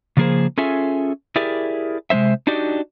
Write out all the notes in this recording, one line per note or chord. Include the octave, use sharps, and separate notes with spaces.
C#3 F3 A#3 G#4 A#4 C5
C#4 F4 G#4 A4 E5 G#5
E4 G4 G#4 A#4 D5 E5
C3 G#3 C4 C5 E5
D4 D#4 F#4 G4 D5 D#5